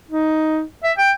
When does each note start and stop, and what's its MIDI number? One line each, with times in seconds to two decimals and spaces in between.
0.10 0.61 63
0.83 0.92 76
0.98 1.11 79